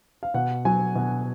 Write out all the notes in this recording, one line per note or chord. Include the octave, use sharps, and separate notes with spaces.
F5
B2 F#5
F#3 G#5
B2